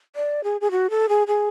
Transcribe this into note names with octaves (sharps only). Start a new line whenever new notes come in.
D5
G#4
G#4
F#4
A4
G#4
G#4